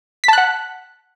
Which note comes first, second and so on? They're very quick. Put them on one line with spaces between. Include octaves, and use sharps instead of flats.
B6 A5 F#6 F#5